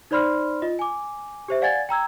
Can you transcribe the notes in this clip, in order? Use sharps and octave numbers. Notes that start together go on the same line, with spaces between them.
D#4 C5 D5 B5 C6 F6
F4 D#5
G#5 D6
G4 C5 E5
D5 F5 F#5 G#5 G#6 A6
G5 A#5 E6 G#6